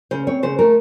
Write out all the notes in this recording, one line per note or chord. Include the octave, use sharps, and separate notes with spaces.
C#3 C5
C4 C#5
C#3 C5
A3 A#4